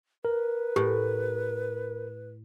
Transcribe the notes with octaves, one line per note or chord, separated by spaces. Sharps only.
A#4 B4
A2 G4